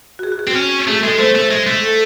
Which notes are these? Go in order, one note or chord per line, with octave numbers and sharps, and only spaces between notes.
F#4
G#4
F#4
G#4
C4
C#4
A3 G#4
G#3 A4
A3 C5
A3
G#3
A3
A4